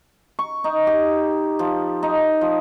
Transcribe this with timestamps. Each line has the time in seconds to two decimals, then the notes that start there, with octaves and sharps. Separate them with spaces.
0.39 C#6
0.64 D#4
0.87 G4
1.59 F3
2.03 D#4
2.41 F3